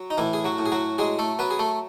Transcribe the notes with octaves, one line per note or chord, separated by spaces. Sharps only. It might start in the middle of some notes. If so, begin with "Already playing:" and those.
Already playing: F#3
D#4
A2 E3 E4
G#4
F#3 F#4
A2
G#4
F#3 F#4
F#3 G#3 G#4
A3 A4
F#3 B3 B4
G#4
A3 A4